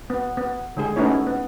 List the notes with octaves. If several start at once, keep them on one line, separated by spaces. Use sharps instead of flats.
B3
B3
D3 G#3 G#4
A3 B3 C#4 D#4 E4 C#5
B3